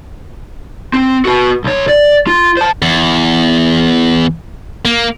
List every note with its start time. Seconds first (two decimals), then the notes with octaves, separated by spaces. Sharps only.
0.94 C4
1.25 F#4 B4
1.64 B1 C#5
1.88 D5
2.27 F4
2.57 C5 A5
2.82 E2
4.85 A#3